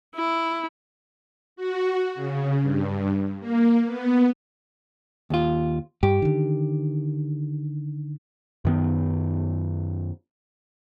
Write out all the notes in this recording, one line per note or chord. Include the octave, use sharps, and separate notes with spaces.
E4
F#4
C#3
G2
A#3
B3
D#2 F4
G2 G4
D3 D#3
F#2 D#3 B3